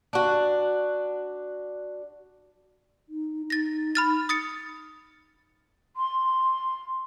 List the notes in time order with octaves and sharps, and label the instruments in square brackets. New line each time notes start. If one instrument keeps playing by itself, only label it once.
[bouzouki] D4 F#4
[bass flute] D#4
[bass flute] D#4 [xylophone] A6 A#6
[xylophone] B5 F6 A6
D#6 A6 C#7
[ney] C6